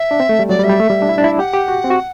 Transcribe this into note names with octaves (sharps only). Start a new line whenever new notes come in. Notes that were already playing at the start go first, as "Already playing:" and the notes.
Already playing: E5
D4
C4
A3
G3
F#3 D5
G3
E5
G3
A3
G3
D4
E4
D4
E4
G4 F#5
G4
F#4
C4
F#4